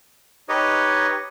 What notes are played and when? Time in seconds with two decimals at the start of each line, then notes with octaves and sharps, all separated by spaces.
0.49 D#4 G4 B4 C#5 D#5